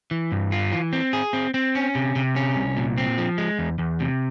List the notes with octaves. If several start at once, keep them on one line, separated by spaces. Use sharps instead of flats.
E3
G2
F4
E3
C4
G#4
C4
C4
C#4
C3
C3
C#4
C2
A#2
C4
F3
G#3
E2
E2
C3